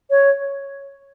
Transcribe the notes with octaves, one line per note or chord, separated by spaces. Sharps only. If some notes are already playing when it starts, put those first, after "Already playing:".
C#5